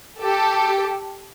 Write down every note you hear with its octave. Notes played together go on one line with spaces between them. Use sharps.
G4 A4